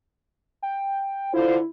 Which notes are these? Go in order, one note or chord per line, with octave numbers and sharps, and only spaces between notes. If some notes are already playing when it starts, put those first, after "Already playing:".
G5
D3 E4 F4 C5